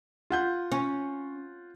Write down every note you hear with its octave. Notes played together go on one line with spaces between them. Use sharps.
F4 F#5 G6
C#4